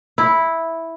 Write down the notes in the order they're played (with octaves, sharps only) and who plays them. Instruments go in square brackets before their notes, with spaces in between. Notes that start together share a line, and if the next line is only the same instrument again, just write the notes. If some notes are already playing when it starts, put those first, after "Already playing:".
[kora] E4